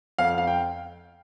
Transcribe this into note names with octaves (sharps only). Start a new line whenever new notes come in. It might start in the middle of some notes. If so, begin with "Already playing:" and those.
F2 F5
F5
G5